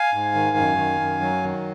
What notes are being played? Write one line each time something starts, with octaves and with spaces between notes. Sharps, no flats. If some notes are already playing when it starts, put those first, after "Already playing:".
Already playing: F5 G#5
G#2
D#3
F#2
D#3
F#2
F#3
D#3